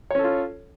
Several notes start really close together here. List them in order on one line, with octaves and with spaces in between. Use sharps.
C#5 C#4 A4 F4